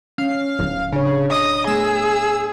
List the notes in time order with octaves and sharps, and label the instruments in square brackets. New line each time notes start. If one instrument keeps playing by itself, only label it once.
[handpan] C#4 [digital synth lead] F5
[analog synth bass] D1
[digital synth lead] C#3 [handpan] D4 C#5
[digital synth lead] D#5 [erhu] D#6
[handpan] A3 B3 [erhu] G#4 [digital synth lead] E6